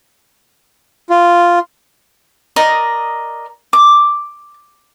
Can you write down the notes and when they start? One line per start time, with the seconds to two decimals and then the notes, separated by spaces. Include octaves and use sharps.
1.10 F4
2.56 A#4 D5 D#5 D#6
3.73 D6